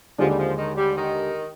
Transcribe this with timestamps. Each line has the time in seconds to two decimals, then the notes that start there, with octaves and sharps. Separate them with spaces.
0.18 D#2 D3 F3 G#3 D4
0.28 G3
0.38 F3
0.57 D#3
0.77 G3
0.96 D#3